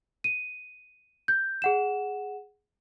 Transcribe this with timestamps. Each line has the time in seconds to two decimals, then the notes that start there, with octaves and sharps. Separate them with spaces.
0.24 D#7
1.28 G6
1.62 G#4 F#5 E7